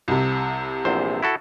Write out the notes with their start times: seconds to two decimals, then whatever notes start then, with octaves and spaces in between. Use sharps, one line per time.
0.08 C2 C3
0.85 A#1 E2 C5
1.23 E4 F#4 A4